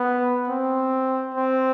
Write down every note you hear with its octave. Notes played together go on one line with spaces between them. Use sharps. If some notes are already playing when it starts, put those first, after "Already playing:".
Already playing: B3
C4
C4